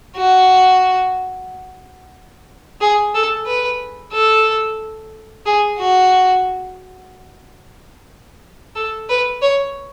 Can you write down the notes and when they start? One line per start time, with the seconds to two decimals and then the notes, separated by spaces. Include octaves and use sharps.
0.17 F#4
2.81 G#4
3.14 A4
3.47 B4
4.13 A4
5.46 G#4
5.79 F#4
8.76 A4
9.09 B4
9.42 C#5